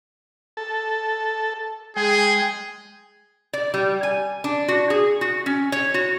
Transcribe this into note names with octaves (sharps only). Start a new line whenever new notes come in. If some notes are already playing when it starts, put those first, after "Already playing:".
A4
G#3 G#4 G5
D5
G3
G#5
D4
F#4
G#4
F#4
C#4
C#5
F#4